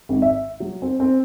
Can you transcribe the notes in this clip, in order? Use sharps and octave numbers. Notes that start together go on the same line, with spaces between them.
G#1
E5
F#3
C4
C4